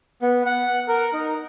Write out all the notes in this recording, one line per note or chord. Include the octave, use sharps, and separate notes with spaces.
B3
F#5
A#4
D#4